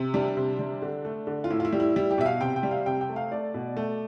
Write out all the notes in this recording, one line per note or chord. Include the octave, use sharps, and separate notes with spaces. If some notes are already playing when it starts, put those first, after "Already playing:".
Already playing: C3
G3 D4
C3
G3
D3
A3
D3
F4
A2 E4
F4
E4
G3
E4
G3 E4
G4
B2 E5
F5
C3 G5
G5
G3
F5
C3 G5
G5
A3
F5
A3 D5
B2
A3